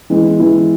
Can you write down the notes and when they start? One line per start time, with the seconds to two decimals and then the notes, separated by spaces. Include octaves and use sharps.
0.10 E3 G#3 B3 E4
0.39 E3 G#3 B3 E4